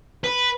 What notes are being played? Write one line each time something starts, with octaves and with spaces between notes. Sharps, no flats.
B4